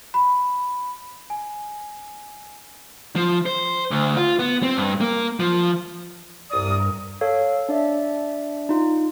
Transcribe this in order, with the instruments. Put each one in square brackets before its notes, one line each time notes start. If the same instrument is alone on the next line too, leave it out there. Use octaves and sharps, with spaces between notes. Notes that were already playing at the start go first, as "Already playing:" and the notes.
[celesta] B5
G#5
[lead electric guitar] F3
C5
D2
F4
B3
C4
G2
A#3
F3
[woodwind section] C2 D5 D#6 [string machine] G2 A#4
[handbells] A4 C#5 F5
D4 D5 E5
D#4 F4